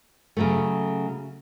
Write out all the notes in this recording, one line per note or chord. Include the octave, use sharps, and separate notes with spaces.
C#3 F#3 A3